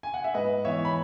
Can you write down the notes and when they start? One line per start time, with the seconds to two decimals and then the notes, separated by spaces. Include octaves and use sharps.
0.03 G#5
0.14 F#5
0.24 E5
0.34 G#2 B4 D#5
0.65 E3 B3 C#5 E5
0.85 B5